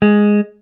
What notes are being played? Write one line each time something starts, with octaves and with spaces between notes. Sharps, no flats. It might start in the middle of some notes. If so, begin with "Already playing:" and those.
G#3